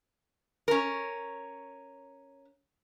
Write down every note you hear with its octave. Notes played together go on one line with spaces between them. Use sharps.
C#4 A#4